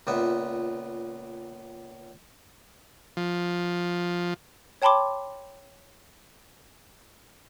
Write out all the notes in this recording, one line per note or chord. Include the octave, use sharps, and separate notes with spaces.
C#2 A#2 B3 E5
F3
C#5 G5 A5 B5 C6 D6